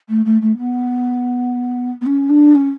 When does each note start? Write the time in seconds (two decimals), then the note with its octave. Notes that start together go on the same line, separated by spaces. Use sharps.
0.09 A3
0.25 A3
0.42 A3
0.58 B3
2.01 B3
2.06 C#4
2.29 D4
2.55 C#4